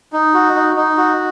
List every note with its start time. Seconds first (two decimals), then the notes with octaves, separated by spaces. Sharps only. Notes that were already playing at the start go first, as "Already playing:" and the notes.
0.13 D#4
0.34 F#4
0.56 D#4
0.76 D#4
0.97 F#4